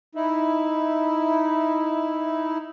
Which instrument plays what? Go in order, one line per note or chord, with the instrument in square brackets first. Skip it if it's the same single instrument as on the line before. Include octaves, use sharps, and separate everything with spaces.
[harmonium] D#4 E4